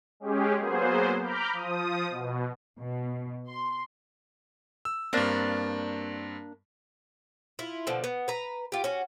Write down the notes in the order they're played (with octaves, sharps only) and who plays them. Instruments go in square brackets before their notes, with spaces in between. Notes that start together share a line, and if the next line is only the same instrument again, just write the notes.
[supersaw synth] G#3 C#4 G4 G#4
F#3 A#3 B3 G#4 C5
A#5 B5 D6 F6 G6
F3 D#6
B2
[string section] B2
C6
[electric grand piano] E6
[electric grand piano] G2 C4 [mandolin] A#3 D4
[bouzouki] E4 F4
B2 D3 F3
B3
B4 A#5
F4 G4
C#4 F#4